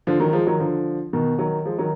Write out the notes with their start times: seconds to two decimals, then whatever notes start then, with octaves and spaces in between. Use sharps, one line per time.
0.07 D3 F3
0.20 D#3 F#3
0.33 F3 G#3
0.47 D#3 F#3
0.60 D3 F3
1.13 B2 D#3
1.39 D#3 F#3
1.65 F3 G#3
1.78 D#3 F#3